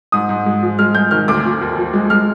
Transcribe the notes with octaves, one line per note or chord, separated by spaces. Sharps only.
G#2 D#6
G#2
G#3
F3
G#3 F6
G#3 G6
D#3 F6
D2 D6
F3
D#2
F3
G#3
G#3 F6